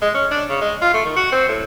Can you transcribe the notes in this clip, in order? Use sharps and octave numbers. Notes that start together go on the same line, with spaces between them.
G#3
C#4
D4
C#3
G#3
F4
A3
D#3
F#4
C4
A2